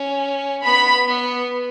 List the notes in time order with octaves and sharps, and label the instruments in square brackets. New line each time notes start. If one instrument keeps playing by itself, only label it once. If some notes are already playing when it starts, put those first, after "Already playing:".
Already playing: [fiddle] C#4
[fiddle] B3 [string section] B5
[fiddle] B3